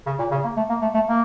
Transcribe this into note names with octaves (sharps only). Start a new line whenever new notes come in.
C#3
A#2
C#3
A#3
A3
A#3
A3
A3
A#3